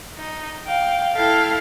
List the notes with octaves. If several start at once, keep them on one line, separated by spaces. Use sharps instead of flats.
D#4
F5 G5
E4 A4 F5 G5 A5